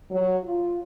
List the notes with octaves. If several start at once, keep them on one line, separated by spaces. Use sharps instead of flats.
F#3
F4